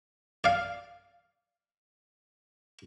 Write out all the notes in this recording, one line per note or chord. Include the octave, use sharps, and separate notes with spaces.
D5 F5